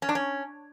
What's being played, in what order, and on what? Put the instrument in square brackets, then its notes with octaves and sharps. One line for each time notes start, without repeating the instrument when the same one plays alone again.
[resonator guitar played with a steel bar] C#4
D4
C#4